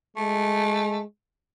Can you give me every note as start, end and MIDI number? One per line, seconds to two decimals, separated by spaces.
0.16 1.04 56
0.16 0.98 57